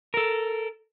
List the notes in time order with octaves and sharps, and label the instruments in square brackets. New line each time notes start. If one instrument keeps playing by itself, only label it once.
[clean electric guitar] A4 A#4